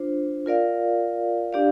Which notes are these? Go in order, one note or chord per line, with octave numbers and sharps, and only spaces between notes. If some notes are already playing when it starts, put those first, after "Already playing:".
Already playing: D4 F4 C5
F4 A#4 D5 F5
D4 G4 D5 F5